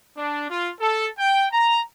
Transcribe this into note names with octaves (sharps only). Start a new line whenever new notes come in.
D4
F4
A4
G5
A#5